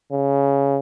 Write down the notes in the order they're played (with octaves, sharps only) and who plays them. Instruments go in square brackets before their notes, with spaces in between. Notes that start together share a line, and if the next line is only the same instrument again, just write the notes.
[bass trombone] C#3